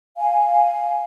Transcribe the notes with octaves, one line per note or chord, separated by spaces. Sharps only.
F5 G#5